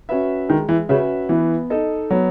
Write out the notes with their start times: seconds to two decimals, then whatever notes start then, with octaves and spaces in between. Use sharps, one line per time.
0.09 C#4 F#4 B4 E5
0.49 D#3 G#3
0.69 E3
0.89 C#3 C#4 F#4 B4 E5
1.29 E3 B3
1.70 D#4 A4 D#5
2.11 F#3 B3